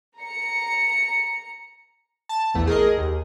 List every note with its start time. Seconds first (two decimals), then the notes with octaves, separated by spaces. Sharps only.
0.19 A#5 C#7
2.29 A5
2.54 A#1 E2 A3
2.67 G#4 A#4 D#5
2.97 D#2